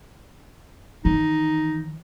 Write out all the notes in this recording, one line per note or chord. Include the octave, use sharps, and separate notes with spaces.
D#3 E3 D#4